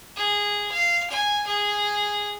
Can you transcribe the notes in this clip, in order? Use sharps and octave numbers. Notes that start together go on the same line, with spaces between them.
G#4
F5
G#5
G#4